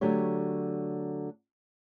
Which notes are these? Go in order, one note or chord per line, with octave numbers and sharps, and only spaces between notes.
D3 F#3 A3 G4 C#5